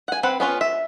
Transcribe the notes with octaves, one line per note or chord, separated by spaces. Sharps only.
F#5 G#5
C4 B4 F#5
B3 C#4 F4 B4
E5